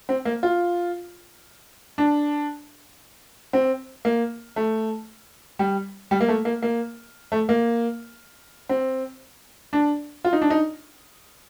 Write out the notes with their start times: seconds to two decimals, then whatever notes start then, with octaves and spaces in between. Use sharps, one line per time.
0.09 C4
0.25 A#3
0.43 F4
1.98 D4
3.53 C4
4.05 A#3
4.56 A3
5.59 G3
6.11 G3
6.21 A#3
6.28 A3
6.45 A#3
6.62 A#3
7.32 A3
7.49 A#3
8.69 C4
9.73 D4
10.24 F4
10.33 D#4
10.42 D4
10.50 D#4